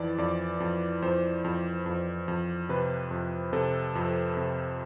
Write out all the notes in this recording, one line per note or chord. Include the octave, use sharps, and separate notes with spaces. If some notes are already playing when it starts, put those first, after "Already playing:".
Already playing: F2 E3 D5
F2 D5
F2
F2 C5
F2
F2
F2
C3 B4
F2
C3 A4
F2
C3